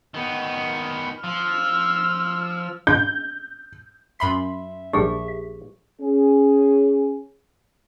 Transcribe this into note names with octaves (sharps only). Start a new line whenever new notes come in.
D#3 B3
F3 E6 F6
G6
F#2 E5 B5 C6
A#1 G3 D4 G4 G#4
C#4 G#4